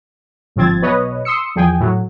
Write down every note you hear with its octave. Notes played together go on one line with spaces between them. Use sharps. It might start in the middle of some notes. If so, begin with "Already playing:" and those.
G1 G#2 F3 C4 G#6 A6
B1 B2 B4 C#5 D#5
C6 D#6 E6 C#7
E2 F3 G#4 G5 G#5
A2 F#3